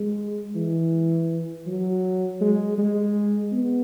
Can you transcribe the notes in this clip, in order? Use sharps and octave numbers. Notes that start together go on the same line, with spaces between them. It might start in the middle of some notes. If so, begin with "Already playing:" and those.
Already playing: G#3
E3
F#3
G#3
G#3
B3